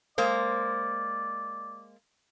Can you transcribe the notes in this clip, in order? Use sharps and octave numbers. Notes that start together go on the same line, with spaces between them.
G#3 A#3 C5 D5